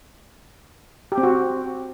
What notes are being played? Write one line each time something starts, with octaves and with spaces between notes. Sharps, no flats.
G4
C4
F#4